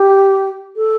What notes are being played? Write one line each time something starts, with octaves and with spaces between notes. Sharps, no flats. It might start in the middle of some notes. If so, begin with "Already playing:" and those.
Already playing: G4
A4